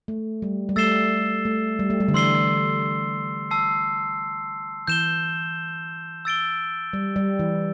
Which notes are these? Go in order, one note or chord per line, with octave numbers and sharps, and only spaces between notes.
A3
G3
G3
A3 E6 A6 C7 E7 G7
A3
G3
A3
G3
D3
E3 C6 E6 C7 G7
A5 E6 C7
E3 G6 E7 G7
E6 A6 D7 G7
G3
G3
E3